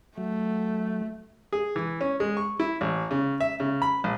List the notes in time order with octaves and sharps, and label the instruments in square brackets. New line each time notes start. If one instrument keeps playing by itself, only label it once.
[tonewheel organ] F#3 [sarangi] A3
[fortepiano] G#4
E3
C#4
G#3
C#6
E4
A1
C#3
E5
C#3
B5
A#1